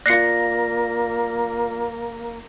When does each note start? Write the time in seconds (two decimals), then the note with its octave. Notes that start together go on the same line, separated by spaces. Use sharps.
0.06 A#3 F4 D5 F#6 A#6 C7 C#7